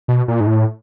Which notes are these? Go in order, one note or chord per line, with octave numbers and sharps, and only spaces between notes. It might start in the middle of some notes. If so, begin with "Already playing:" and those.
B2
A#2
G#2
A2